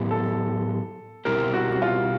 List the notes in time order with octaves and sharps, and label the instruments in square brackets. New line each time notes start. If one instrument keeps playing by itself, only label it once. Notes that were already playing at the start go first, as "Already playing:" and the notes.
Already playing: [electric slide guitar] A2 F#3 B3 E4 G4
[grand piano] A4
[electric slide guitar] B2 G3 C4 E4 G4 [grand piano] A#4
[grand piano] F#4
F#4
F4